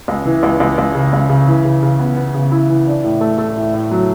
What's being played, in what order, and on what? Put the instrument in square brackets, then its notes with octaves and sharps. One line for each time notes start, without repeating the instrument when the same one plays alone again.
[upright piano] C#2
E3
C#2
C#2
C#2
C#3
C#2
C#3
E3
C#3
C#3
B3
B3
C#3
E4
E3
D4
A2
A3
A3
A2
A2
F#3